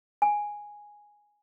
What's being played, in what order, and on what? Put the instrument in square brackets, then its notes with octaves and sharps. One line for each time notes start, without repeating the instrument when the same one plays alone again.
[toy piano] G#5